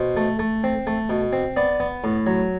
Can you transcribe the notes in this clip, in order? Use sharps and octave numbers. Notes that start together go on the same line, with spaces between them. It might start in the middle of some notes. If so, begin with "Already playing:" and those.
Already playing: B2 C5
A3
A3
C4
A3
B2
C4
B3 D5
B3
A2
F#3